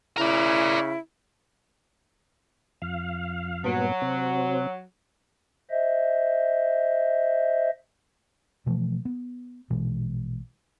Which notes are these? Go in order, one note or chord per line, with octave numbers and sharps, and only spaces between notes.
C#3 E4 A#4 D5
F2 F5
G2 A#2 F#3 B3
C3 C4
C5 D#5 E5
B2 E3 F3 A3
B3
A#1 B2 E3 G#3